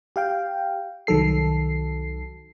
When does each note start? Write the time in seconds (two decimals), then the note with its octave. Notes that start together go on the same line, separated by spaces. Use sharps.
0.16 G4 F5 G5
1.07 C2 D#3 F#3 A4 C7